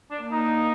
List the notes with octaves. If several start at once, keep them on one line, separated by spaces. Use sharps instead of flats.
D4
A#3
D#4